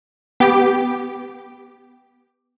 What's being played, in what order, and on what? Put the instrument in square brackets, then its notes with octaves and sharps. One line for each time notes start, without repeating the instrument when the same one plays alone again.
[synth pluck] B3 G4 D6